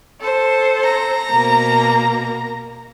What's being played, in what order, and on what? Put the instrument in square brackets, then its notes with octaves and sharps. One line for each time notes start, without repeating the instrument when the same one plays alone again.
[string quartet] A4 C5
[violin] A#5
[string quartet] B2 A#3